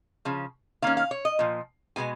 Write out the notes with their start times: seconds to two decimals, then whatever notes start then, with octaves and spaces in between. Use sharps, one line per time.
0.25 C#3 F3
0.82 D#3 A#3 C#4 F5
0.97 F5
1.11 C#5
1.25 D#5
1.39 A#2 F3
1.96 B2 G#3 B3 G#5